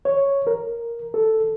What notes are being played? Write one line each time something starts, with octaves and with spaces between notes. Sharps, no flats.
C#5
A#4
A4